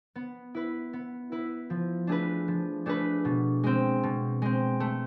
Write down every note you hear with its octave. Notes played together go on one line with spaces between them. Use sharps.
B3
E4 B4
B3
E4 B4
F3
A3 D4 G#4 B4
F3
A3 D4 G#4 B4
B2
G#3 C4
B2
G#3 C4
A3